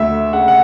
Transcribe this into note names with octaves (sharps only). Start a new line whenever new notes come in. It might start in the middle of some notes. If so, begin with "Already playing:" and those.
Already playing: D2 E5
C#3 F#5
F#5